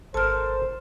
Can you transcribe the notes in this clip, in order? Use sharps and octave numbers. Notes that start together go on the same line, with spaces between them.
G#1 A4 A#4 C5 A5 F6 A6 E7